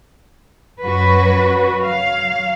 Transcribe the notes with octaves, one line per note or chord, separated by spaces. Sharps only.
F#2 F#4 B4
F#3 F5